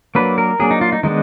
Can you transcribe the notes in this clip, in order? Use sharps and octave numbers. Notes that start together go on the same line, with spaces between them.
F#3 A#3 D4 B4
A#4
F#3 A#3 D4 G#4
D#4
F4
D#4
D#3 G#3 B3 D4 D#4